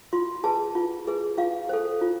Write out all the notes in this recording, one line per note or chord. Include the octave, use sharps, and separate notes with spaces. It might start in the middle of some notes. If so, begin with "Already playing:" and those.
F4 C6
G#4 B4 A5
F4
G#4 B4
F4 F5
A4 C5
F4